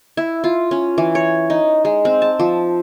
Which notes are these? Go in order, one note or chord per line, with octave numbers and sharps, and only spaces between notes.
E4
F4
C#4
E3
C#5
D#4
G#3
C4
A5
F3